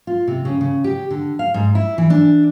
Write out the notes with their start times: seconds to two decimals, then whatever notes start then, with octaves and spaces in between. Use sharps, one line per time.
0.07 F4
0.28 C3
0.45 C#3
0.61 C#3
0.84 G4
1.11 D3
1.39 F5
1.54 G#2
1.75 E4
1.98 E3
2.10 D4